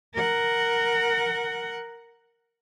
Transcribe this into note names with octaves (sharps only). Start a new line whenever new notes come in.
A#4 F#5